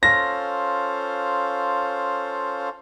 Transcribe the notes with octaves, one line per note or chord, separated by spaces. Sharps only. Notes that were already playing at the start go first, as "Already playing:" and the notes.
C#4 F4 A4 C5 F5 A#6